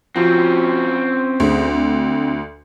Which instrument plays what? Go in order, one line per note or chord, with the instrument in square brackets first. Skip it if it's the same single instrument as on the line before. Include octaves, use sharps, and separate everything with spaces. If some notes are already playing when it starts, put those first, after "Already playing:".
[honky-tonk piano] F3 [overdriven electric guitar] C4 C#4 [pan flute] F#4
[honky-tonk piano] D2 [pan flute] G#4
[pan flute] C4